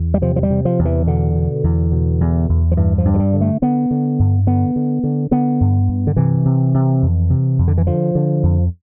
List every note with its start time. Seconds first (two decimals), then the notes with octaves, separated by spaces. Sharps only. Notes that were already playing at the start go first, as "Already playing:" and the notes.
Already playing: E2
0.14 G3
0.22 C3 F3
0.36 F3
0.43 G3
0.50 C3
0.65 F3
0.79 E2
0.85 E3
1.07 B2 D3
1.35 B2
1.64 E2
1.92 B2
2.21 E2
2.49 E2
2.72 F3
2.77 G2 E3
2.98 F3
3.05 G2
3.14 F3
3.19 G3
3.33 D3
3.41 A3
3.62 D3 B3
3.91 D3
4.19 G2
4.47 D3 B3
4.76 D3
5.04 D3
5.31 D3 B3
5.61 G2
5.89 G2
6.07 D3
6.16 C3 E3
6.45 C3
6.74 C3
7.02 F2
7.30 C3
7.59 F2
7.68 D3
7.78 E3
7.87 D3 F3
8.15 D3
8.43 F2